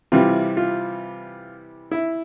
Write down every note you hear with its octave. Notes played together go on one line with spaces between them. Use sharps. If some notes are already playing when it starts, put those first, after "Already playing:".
C3 E3 G3 F4
F4
E4